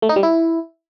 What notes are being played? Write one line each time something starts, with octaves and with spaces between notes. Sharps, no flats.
A3
D#4
G3
E4